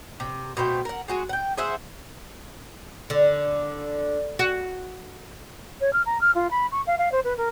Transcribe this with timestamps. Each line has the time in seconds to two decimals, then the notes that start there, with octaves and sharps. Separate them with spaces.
0.20 C3
0.57 B2 A3 C5 G5
0.85 A#4 F#5
1.08 G#3 F#4 G#4
1.29 F#5 G5
1.57 G#4 C5 E5 F#5
3.10 D3
4.39 F#4
5.80 C#5
5.93 F6
6.05 A#5
6.21 F6
6.34 F4
6.50 B5
6.71 C#6
6.86 F5
6.98 F5
7.11 C5
7.24 B4
7.37 A#4